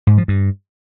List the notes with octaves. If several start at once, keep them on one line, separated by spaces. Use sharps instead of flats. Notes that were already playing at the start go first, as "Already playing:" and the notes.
G#2
F3
G2